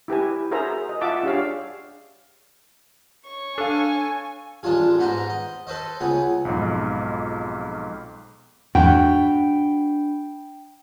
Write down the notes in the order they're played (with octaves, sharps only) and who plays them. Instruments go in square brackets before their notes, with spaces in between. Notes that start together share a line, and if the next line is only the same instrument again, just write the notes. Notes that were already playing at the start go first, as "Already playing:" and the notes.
[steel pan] E4 G4 B4 G#5
F#4 G#4 A#4 C5 E5 A#5
D#5
F4 E5 F#5 A5 D6
D4 G4 G#4 C#5 F5
[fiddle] C#5 C#6
[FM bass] D4 [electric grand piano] A4 F5 [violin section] G#5
[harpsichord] A1 G#3 D4 F4 G#4
G#2 B3 D#4 C5 A#5
D#5
A4 B4 C5 D#5
C#2 B3 G#4 D#6
[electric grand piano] B1 F2 G#2
[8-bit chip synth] E2 [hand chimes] D4 B5 D7 [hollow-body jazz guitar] F#4 [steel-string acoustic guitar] G5